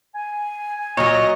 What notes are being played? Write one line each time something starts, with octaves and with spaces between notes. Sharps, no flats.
G#5
A#2 F#3 C#5 D#5